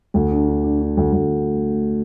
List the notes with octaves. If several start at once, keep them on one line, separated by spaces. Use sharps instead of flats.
D2
D4
D4
D4
D4
D2
D2